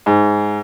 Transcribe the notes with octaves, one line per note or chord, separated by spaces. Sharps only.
G#2